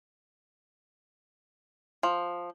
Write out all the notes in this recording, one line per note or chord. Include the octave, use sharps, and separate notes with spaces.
F3